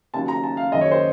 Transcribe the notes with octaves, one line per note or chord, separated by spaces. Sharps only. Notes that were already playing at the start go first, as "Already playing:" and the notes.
D#2 C#3 F#3 A5
A#5
A5
F5
F#1 F#2 D#3 D#5
C#5
C5